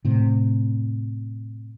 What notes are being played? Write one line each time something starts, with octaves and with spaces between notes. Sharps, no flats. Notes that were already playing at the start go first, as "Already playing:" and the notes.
A2 C3